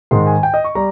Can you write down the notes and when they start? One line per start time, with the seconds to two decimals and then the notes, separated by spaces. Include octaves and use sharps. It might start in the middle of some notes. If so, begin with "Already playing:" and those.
0.11 G#2 D#3 G#3 C6
0.27 G#5
0.43 G5
0.54 D#5
0.64 C#6
0.75 G3 A#5